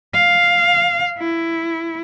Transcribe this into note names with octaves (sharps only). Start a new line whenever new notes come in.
F5
E4